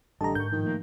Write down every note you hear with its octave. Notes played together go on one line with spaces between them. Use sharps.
A1 D3 G3 G4 A4 D#5 A5 A#5
G#2 A#4 C#6 G6
A2 D#3 F3
A3 A#3